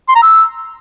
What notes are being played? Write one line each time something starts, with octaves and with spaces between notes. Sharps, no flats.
C6
A#5
E6